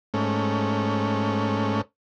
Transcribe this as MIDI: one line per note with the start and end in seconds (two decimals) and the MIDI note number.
0.14 1.81 44
0.14 1.81 57
0.14 1.81 61